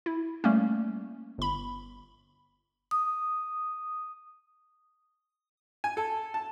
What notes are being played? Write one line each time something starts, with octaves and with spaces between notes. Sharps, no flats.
E4
G3 A3 A#3 C#4
G1 B5
D#6
G#5
A4
A5